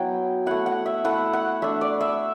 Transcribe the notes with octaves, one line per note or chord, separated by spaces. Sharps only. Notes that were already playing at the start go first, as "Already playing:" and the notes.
Already playing: F#3 B3 E4 G5
A3 E4 F#5
F#5
E5
A3 E4 F#5
F#5
A3 D4 E5
D5
E5